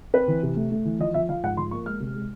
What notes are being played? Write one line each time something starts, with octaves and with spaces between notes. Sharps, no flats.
C4 B4
E3
C3
A3
A3
E3
F3 D#5
F3 E5
F3 F5
G#2 F#5
F3 C6
A#3 C#6
G#3 F6
C3
G#3